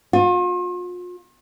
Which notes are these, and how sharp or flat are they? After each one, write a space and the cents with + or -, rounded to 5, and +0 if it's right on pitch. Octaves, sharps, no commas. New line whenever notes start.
F4 +40